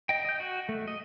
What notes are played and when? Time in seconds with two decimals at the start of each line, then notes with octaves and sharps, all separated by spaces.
0.09 D#5 G5
0.25 D#5 G6
0.40 F#4
0.69 A3
0.88 D#5